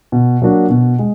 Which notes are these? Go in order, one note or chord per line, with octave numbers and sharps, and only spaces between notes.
B2
F#3 A#3 D4 F#4
B2
G#3